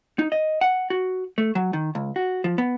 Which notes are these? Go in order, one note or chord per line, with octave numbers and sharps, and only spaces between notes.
D#4
D#5
F#5
F#4
A3
F#3
D#3
C#2
F#4
F3
B3